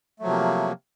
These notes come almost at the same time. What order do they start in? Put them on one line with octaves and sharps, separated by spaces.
A3 F#3 F3 C3 A#3